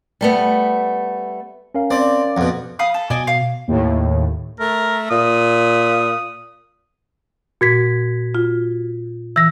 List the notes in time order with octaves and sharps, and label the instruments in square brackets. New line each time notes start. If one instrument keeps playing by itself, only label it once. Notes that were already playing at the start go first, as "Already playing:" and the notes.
[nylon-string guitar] G3 A3 B3
[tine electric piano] C#4 A#4 F5
[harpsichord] C4 [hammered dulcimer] D5
[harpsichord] F2 B2 [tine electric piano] F#5
[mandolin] F5 B5 D#6
A4
[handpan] B2 [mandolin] D5 D#5 G#5
[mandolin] F5
[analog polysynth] D#2 A2
[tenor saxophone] A3 [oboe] A#4
[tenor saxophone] A#2 [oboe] D#6
[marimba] A#2 [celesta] F#4 G#6 B6
[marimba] F4
[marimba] E3 [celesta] E6 A#6